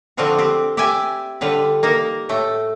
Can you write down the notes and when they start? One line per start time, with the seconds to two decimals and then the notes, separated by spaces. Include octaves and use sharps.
0.17 D3 F3 C4 D4 F4 F#4
0.38 C4 G4
0.77 G4 D5 E5 G5 G#5
1.41 D3 G3 F4 B4
1.83 A#3 D#4 A#4
2.29 A2 A3 G5